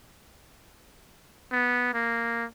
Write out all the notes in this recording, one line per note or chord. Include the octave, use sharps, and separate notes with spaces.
B3
A#3